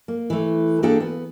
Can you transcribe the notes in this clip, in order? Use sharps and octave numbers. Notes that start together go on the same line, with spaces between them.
A#3
E3 A3
A#3 D4 F#4 G#4 A4 G5
B3